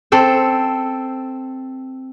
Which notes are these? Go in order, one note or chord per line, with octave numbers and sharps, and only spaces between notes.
C4 A4 C5